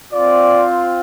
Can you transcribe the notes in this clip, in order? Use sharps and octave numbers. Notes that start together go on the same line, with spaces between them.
C4 F4 D5